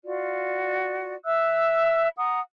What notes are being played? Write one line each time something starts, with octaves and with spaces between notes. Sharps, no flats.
F4 F#4 D5
E5 E6 F#6
F#5 A#5 D#6